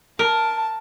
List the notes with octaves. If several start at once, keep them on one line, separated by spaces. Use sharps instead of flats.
A#4 A5